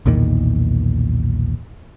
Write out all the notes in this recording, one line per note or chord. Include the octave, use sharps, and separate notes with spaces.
B1 E2 A#2 D#3